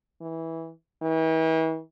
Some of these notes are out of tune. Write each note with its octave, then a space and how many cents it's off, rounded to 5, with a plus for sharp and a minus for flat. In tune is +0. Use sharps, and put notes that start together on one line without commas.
E3 -15
E3 -40